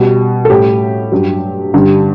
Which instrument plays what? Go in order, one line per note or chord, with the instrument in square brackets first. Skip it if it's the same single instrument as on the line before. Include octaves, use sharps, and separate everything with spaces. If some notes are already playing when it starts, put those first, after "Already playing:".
Already playing: [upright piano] B2 G3
A4
A2 G3 G4
G2 F#3
G2 D3 G3